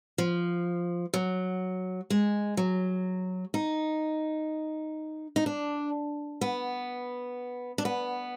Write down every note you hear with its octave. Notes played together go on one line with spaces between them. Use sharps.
F3
F#3
G#3
F#3
D#4
D#4
D4
B3
D4
B3